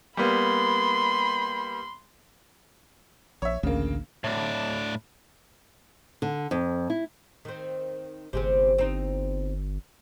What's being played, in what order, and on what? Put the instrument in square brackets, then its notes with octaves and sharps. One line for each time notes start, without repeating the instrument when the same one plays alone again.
[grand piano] G3 A#3 B3 [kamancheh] B5 C6
[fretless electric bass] A#1 [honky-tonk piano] C#5 E5
[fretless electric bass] A1 D2 [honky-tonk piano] C#3 A#3
[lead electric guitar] A2 D4
[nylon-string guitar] D3
F2
E4
[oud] D#3 C4
[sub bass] G1 [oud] C3 G#3 C4
[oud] C4 D#4